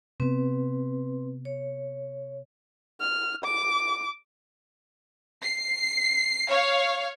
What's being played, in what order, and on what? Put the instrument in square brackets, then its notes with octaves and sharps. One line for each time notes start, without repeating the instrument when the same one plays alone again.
[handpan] C3 B3 [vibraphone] C4 B4
[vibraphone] C#5
[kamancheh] F6
D6
[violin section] C7
C#5 F5